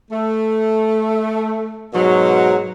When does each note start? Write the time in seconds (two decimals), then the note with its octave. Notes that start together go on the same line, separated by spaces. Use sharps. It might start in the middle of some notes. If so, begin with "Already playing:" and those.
0.11 A3
1.93 G#2 B2 F#3